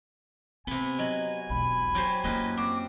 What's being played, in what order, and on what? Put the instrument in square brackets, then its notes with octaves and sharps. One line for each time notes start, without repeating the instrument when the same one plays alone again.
[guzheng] C3 B3 [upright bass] C4 [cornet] G#5
[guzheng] F#3 [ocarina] D#5
[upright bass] E1 B1 [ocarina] B5
[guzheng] F#3 G4 C5
[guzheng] F#2 B4 D#5 [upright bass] A#3 E4
[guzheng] C4 [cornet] F#4 [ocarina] D6